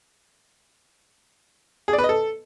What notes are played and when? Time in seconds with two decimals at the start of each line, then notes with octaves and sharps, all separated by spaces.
1.88 G#4
1.93 D5
1.98 B4
2.04 D#5
2.09 A4